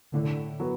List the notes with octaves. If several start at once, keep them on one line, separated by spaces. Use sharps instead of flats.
A2 D3
F#3 B3